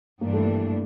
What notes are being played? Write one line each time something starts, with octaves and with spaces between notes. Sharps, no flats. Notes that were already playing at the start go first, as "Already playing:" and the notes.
G2 E3 G3 A#3 D4
A3
A#3